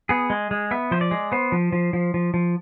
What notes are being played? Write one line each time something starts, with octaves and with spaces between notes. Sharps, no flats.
B3 G#4
G#3
G#3
B3 E5
F3 C5
D5
G#3
B3 C5
F3
F3
F3
F3
F3